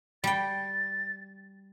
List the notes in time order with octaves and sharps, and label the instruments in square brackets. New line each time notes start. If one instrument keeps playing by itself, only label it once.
[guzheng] G3 G5 [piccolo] A6